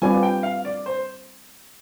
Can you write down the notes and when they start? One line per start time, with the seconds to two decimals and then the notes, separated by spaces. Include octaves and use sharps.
0.02 G3 C4 F4 B4 D5 G#5
0.23 G5
0.43 F5
0.65 D5
0.86 C5